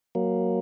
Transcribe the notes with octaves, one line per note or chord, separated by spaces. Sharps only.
F#3 A#3